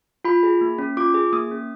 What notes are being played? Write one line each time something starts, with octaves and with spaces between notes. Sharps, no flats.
F4 B5
G#4
A#3
C#4
F4 D6
G#4
A#3 D#6
C#4